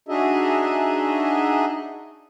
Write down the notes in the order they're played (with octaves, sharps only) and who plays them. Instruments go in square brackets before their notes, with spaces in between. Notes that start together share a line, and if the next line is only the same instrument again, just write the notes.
[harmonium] D4 D#4 F#4 G#4 D#5 E5